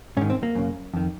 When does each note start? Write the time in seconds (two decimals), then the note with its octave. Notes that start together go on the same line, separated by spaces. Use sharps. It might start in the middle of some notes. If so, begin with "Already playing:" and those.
0.17 G#2 C#4
0.21 D#3
0.30 C4
0.43 A#3
0.55 F#2 C#3
0.94 F2 D#3